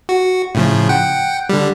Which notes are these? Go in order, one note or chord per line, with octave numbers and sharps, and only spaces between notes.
F#4
A2 C#3 F3
F#5 G5
D3 G3